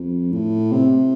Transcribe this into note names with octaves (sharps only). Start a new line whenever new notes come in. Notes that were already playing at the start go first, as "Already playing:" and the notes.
Already playing: F2
A2
C3